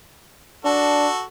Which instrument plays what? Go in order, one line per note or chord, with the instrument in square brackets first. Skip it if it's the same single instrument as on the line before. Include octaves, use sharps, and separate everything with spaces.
[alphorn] D4 [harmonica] F#4 A4